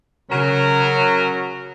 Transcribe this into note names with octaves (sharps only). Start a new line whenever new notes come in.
C#3 F#3 C#4 A#4